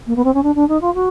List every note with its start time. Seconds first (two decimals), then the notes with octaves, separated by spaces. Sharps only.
0.07 A#3
0.16 B3
0.24 C4
0.34 C#4
0.43 D4
0.55 D4
0.68 D#4
0.81 F4
0.94 F#4